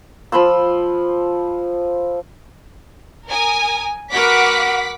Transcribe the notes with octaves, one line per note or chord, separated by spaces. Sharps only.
F3 B5 C6 E6
A#4 G#5 D#6
F#4 A#4 B4 F#5 D6 B6